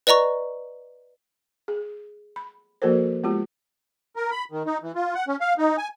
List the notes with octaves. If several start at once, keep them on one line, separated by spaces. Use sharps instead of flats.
B4 D5 D#5 A#5 C#6
G#4
B5
F3 A#3 F#4 A4 A#4 C5
G#3 B3 F4 G4
A#4
B5
D#3
D#4
E3
F4
F#5
C#4
F5
D#4
G#5